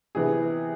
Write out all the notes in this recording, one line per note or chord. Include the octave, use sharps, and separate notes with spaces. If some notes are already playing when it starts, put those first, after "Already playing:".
C3 E3 B3 G#4